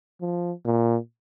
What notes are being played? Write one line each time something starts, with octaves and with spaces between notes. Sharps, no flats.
F3
A#2